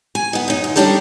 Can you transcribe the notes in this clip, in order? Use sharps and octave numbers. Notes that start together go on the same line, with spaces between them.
G#5
B3 D#4
F#2 D#4
D2
D#3 G3 C#4 D4 G4 A4